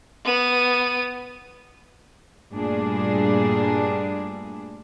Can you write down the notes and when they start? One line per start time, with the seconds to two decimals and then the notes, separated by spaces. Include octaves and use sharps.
0.25 B3 D#7
2.52 G2 A#2 G3 A3 D4 G#4